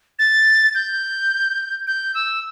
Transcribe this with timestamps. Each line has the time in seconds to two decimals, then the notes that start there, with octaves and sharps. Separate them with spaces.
0.19 A6
0.75 G6
1.87 G6
2.15 E6